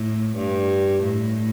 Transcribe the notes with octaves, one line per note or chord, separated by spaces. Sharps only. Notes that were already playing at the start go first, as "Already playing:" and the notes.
Already playing: A2
G2
A2